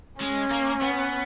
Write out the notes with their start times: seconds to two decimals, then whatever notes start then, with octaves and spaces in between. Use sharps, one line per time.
0.20 G#3 C#4
0.51 A#3
0.82 B3